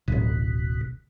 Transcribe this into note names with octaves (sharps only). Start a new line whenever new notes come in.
D1 A1 B2